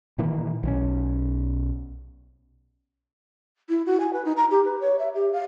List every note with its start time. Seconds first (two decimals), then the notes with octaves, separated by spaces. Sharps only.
0.18 A#2 D#3 E3 A#3
0.63 B1 D#3 C#4
3.69 E4
3.85 F#4
3.99 G#5
4.13 B4
4.24 D#4
4.36 A#5
4.50 G4
4.65 B4
4.80 C#5
4.98 E5
5.14 G4
5.32 F5